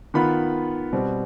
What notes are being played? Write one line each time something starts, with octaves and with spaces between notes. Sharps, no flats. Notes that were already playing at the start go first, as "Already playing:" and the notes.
D#3 B3 F4 B5
B2 G3 C4